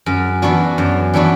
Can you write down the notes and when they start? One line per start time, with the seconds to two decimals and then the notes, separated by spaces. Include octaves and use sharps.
0.06 F#2
0.42 E3 B3 D4 F#4
0.78 F#2
1.14 E3 B3 D4 F#4